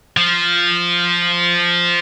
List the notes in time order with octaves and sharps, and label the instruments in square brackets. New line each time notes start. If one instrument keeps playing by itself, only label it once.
[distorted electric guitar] F3